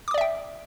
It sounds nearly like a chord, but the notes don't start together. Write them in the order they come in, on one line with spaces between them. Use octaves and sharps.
D6 D#6 D5 E5 G5